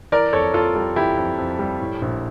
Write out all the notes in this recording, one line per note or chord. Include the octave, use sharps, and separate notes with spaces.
E3 A#4 D5
F2 A4 C#5
F2 F4 A4
G3
E3 E4 G4
F2
F2
G3
A2
A#1